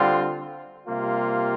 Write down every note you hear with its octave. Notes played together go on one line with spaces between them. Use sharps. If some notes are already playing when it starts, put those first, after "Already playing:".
Already playing: D3 G3 C4 F4
C3 G3 A#3 F4